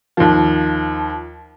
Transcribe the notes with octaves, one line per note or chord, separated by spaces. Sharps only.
D#2 F3